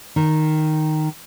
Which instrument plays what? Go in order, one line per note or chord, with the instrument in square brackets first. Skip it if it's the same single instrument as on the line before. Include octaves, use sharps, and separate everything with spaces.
[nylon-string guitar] D#3